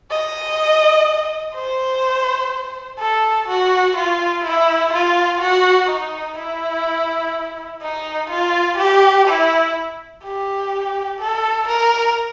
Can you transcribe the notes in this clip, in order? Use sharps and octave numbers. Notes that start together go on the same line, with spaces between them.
D#5
C5
A4
F#4
F4
E4
F4
F#4
D#4
E4
D#4
F4
G4
E4
G4
A4
A#4